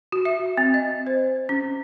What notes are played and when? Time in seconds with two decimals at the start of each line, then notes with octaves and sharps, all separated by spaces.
0.12 F#4
0.25 E5
0.57 C4
0.74 D#5
1.07 C5
1.49 C#4